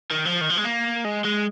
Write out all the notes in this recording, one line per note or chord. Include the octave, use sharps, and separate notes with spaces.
D#3
F3
D#3
F3
G#3
A#3
G#3
G#3